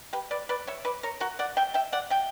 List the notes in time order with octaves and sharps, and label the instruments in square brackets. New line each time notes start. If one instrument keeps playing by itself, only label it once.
[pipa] G4 B4
B4 D5
B4 D5
C#5 E5
B4 D5
A#4 C#5
F#4 A#4
D5 F#5
E5 G5
E5 G5
D5 F#5
E5 G5